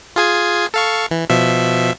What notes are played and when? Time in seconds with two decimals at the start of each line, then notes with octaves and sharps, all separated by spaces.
0.16 F4 G#4 G#5
0.74 A4 F5 C#6
1.11 E3
1.30 B2 F3 E5